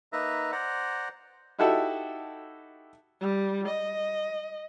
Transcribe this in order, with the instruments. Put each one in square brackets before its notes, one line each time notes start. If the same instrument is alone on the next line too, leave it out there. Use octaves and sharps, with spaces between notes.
[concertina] A#3 D#4 B4 E5 A#5
C5 D5 F#5 A#5
[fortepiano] D#4 E4 F#4 G4 A4 E5
[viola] G3
D#5